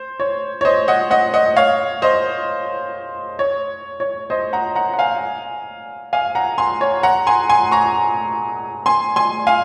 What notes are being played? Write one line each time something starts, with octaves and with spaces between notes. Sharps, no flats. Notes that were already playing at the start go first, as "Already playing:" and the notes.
Already playing: C5
C#5
C#5
C5 D#5
D#5 F#5
D#5 F#5
D#5 F#5
C#5 F5
C5 D#5
C#5
C#5
C5 D#5
F#5 A#5
F#5 A#5
F#5
F5 G#5
F5 G#5
F#5 A#5
G#5 C6
C#5
F#5 A#5
G#5 C6
G#5 C6
A#5 C#6
G#5 C6
G#5 C6
F5 G#5